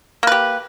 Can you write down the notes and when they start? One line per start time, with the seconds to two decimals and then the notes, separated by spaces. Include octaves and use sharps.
0.23 A#3
0.27 B4
0.32 G4